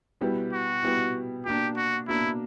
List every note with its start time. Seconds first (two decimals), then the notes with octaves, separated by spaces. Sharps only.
0.21 B2 G3 B3 E4
0.53 F#4
0.83 B2 G3 B3 E4
1.45 B2 A#3 D4 G4
1.76 F#4
2.08 B2 A#3 D4 E4